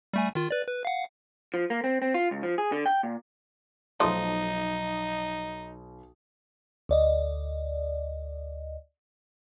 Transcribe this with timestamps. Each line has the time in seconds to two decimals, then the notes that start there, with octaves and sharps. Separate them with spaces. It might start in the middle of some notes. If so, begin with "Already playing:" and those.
0.14 G3 A3 G#5
0.35 D#3 F4
0.51 B4 D5
0.67 B4
0.85 F5 F#5
1.54 F3
1.70 A#3
1.84 C4
2.02 C4
2.14 F4
2.31 C#2
2.43 F3
2.58 G#4
2.72 D3
2.86 G5
3.03 A#2
4.00 B1 F3 A3 D#4 D#6
6.89 D2 D5 D#5